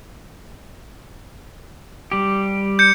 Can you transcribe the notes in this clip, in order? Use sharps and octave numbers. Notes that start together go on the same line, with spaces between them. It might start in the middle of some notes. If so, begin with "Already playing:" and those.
G3 G4
G6 C#7